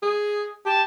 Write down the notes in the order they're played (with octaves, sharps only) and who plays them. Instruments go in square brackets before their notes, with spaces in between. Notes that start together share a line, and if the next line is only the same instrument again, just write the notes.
[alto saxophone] G#4
[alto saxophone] G4 [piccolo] A5